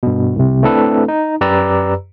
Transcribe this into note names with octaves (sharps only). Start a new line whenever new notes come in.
G2 B2
C2 C3
A3 C4 D4 E4 A4 B4
D#4
F#2 G4 B4 D5 A#5 E6